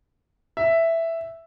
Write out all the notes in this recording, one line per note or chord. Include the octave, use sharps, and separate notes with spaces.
E5